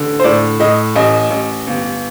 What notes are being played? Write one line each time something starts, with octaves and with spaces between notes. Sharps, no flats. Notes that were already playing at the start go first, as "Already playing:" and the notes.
Already playing: A1 D3
C5
A2 D5
A2 D#5
A1 D#5
A1
G1